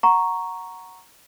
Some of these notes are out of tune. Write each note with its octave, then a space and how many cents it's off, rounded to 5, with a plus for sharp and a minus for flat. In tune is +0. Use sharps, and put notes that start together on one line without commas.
F#5 -10 A#5 +0 C#6 +0